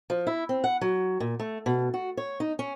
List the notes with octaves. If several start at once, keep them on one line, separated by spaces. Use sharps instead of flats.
F3
E4
C4
F#5
F#3
A#2
A3
B2
F#4
C#5
D#4
C#4